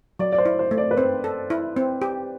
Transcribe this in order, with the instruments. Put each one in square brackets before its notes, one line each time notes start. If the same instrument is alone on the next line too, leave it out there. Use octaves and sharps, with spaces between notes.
[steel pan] F#3 [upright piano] D5
[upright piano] D5
C5
[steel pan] E4
[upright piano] C5
[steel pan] A3
[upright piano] D5
B4
[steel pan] C4 [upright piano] C5
[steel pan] A4
E4
C4
G4